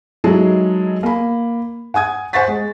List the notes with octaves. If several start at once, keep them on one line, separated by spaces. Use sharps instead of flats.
F#3 G#3 D#4 E4 G#4 A4
A#3 B5
F#5 G#5 D#6 G#6
C5 F#5 G#5 C#6 A6 B6
G#3